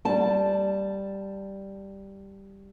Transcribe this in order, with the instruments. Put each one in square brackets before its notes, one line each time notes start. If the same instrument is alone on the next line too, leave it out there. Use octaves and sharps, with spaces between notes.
[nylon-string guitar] G3 A5